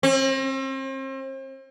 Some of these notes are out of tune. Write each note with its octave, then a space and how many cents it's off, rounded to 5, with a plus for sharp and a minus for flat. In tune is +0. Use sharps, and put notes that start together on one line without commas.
C4 +40